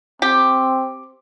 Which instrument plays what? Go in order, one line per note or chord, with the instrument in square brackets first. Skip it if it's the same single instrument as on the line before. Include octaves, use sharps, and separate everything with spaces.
[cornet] C4 [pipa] G4